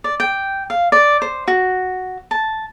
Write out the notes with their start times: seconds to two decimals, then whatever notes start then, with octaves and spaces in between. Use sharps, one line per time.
0.04 D5
0.20 G5
0.70 F5
0.92 D5
1.22 C5
1.48 F#4
2.31 A5